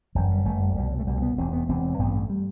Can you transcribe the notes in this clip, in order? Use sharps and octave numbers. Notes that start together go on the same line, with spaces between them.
G1 F#2 E3
G3
G1 F#2 A3
G3
C2 B2 G3
F#3
A3
C2 B2 G3
B3
E1 E2 C3 C4
B3
E1 E2 C3 C4
A1 G2 B3
A3
G3